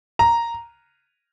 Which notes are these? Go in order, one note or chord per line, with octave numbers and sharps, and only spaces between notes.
A#5